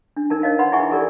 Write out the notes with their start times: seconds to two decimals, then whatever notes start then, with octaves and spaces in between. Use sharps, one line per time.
0.16 D4
0.30 D#4 A#4 A5
0.42 C#5 D#5 F5 A5
0.59 B4 F#5 B5 C6
0.72 E4 G#4 E5 F#5 G#5 C#6
0.90 G4 A4 A#4 D5